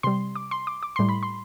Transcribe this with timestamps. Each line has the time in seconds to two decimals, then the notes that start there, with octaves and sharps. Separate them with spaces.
0.03 C3 G3 C6
0.35 D6
0.51 C6
0.67 D6
0.83 D6
0.96 A2 G3 C6
1.09 B5
1.23 C6